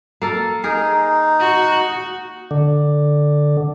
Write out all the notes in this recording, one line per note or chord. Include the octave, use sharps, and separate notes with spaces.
A#3 A4 A#4
D#4 G#4 A#4
F#4
D3